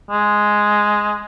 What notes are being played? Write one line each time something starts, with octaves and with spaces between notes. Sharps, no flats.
G#3